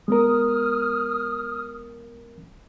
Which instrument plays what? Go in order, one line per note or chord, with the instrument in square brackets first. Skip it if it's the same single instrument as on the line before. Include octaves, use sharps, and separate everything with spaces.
[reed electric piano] G#3 B3 A#4 [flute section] D#6 F6